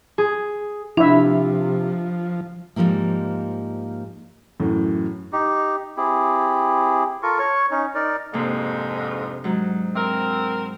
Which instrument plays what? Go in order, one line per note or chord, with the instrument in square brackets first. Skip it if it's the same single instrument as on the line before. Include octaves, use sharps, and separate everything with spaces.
[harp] G#4
[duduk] C3 [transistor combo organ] F3 [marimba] D4 [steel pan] E4 E5
[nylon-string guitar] G#2 D#3 F3 G3 A#3
[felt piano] F#2 A2 E3
[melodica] D#4 G4
C4 E4 G4 G#4
F4 A4 A#4 C#6
C#5 C#6
C#4 D#4
D#4 A#4 D5
[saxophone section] F2 G#2 [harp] C3 A#3 D4
[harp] G#2 F#3
[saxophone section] C4 A#4